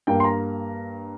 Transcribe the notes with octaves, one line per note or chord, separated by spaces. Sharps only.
G2 G3 A#3 G5
C6
A#5